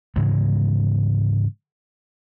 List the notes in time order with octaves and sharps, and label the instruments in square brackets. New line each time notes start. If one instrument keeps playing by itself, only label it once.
[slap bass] G#2 C#3 E3 G#3